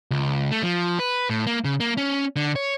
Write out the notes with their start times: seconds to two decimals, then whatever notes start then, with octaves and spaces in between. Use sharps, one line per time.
0.11 C#2
0.51 A3
0.63 F3
0.99 B4
1.30 A2
1.47 A#3
1.64 C#3
1.80 A#3
1.97 C#4
2.36 D3
2.56 C#5